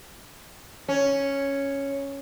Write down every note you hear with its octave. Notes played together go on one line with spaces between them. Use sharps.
C#4